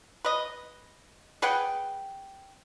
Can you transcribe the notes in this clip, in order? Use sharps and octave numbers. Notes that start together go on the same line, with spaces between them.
B4 D#5
G#4 B4 F#5 G5